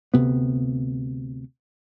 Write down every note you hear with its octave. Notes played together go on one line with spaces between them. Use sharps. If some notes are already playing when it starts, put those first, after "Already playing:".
D2 C3 B3